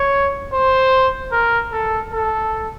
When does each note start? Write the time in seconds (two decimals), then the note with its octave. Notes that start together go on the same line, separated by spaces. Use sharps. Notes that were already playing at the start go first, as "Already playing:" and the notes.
Already playing: C#5
0.52 C5
1.32 A#4
1.72 A4
2.13 A4